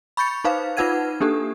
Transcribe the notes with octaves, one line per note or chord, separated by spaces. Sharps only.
B5 C#6 G6 A6 C#7
D#4 B4 C5 F5
D#4 F4 B4 F#5 G#6 D#7
A#3 D4 G4 A4